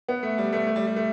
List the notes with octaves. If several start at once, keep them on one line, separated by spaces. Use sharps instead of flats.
B3
A3
G3
A3
A3
G3
G3
A3